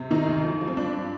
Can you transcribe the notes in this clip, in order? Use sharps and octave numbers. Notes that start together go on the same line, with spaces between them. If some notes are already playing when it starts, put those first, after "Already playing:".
Already playing: C3
D#3 D#4
D2
F3
F3
C4
G2 D4
G2